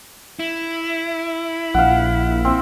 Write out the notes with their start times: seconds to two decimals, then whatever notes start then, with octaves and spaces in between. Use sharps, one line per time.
0.39 E4
1.74 A#1 F5 F#5
2.45 C4